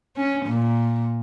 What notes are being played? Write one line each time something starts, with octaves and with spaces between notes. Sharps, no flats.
C#4
A#2